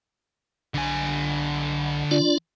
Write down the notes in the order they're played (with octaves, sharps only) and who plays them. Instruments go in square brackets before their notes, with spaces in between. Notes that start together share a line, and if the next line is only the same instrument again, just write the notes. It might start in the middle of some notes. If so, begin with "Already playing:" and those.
[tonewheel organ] B1 [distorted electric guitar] D3 G#5
[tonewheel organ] D4 F4 D5